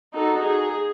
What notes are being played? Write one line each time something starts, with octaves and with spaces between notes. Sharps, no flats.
D#4 F#4 A4
G#4